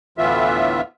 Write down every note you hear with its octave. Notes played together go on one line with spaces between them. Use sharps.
D2 A2 E3 B3 F4 E5